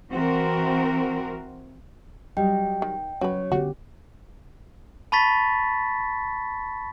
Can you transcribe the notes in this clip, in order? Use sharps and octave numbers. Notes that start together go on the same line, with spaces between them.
E3 C4 F#4 A#4
F#3 G3 D#5 G5
D#3
F#3 C#4 F#4 B4 C#5
D3 B3 F#4 G4
A5 B5 C#6 A6 B6